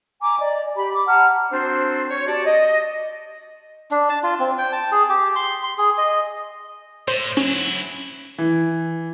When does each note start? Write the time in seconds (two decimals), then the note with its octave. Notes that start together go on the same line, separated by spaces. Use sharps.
0.21 G#5 A#5 D6
0.39 D5 D#5
0.76 G4 B5
0.93 D6
1.07 F#5 A5 A#5 F6
1.52 C4 D4 F#4 A4 C5
2.10 C#5
2.27 F#4 G4 D5 A5
2.46 D#5
3.91 D4
4.09 A5
4.23 F4
4.39 C4
4.58 G5
4.73 A5
4.92 G#4
5.09 G4
5.36 C6
5.63 C6
5.78 G#4
5.98 D#5
7.08 A2 C5
7.37 F#3 C#4 E4
8.38 E3